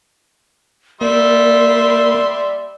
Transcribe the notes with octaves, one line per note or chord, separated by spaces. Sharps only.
G3 A#3 D5 E5 C6